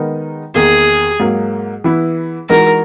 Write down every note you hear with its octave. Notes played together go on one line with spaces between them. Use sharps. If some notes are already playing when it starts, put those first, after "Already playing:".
Already playing: D#3 G#3 B3 D#4 A#4
E2 D#3 A#3 G#4
G#2 F#3 A#3
E3 B3 E4 B4
E3 G#3 D#4 F#4 A#4